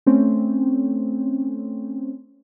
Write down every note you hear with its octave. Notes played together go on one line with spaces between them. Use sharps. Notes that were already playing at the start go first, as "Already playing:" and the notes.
A3 C4 C#4